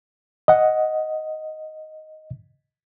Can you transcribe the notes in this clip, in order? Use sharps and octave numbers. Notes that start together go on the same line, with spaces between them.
D#5 F#5